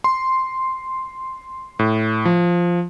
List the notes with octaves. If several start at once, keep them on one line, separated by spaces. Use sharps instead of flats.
C6
A2
F3